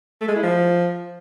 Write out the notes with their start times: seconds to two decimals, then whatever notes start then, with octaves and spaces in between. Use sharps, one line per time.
0.21 A3
0.28 G#3
0.36 E4
0.43 F3